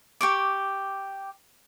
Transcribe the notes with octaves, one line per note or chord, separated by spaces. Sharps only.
G4 C#6 D6